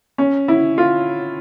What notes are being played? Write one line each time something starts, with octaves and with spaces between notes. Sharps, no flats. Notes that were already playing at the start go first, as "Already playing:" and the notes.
C#4
E4
F4